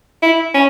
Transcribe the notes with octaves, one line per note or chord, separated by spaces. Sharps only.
E4
C#4